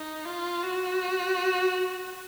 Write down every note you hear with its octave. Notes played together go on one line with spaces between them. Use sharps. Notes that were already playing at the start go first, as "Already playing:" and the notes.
Already playing: D#4
F4
F#4